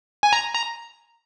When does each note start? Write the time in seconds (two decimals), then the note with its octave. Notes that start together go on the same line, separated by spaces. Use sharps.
0.23 G#5
0.33 A#5
0.55 A#5